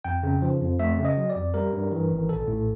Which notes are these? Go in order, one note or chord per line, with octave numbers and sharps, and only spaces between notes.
F2 G5
C#3
F3
F2
A3 E5
C#3
D#5
F#3
D5
F2
G3 A#4
G2
E3
G#1
A#1 A4
A2